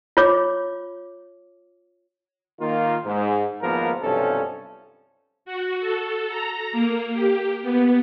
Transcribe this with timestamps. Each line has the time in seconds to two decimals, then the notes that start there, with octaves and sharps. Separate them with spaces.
0.17 F4 C#5 D6
2.61 D#3 A#3 F4
3.05 G#2
3.62 G#1 C#2 F3 A#3 B3 A#4
4.03 B1 G2 C3 F3 C#4 A4
5.45 F#4
5.80 A4
6.29 A#5
6.72 A#3
7.13 G4
7.62 B3